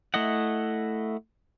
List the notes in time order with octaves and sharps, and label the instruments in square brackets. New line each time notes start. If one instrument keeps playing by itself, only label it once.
[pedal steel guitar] A3 E4 D#5 F#5